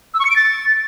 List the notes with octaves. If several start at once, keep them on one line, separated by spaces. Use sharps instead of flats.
E6
C#6
C#7
D7
A6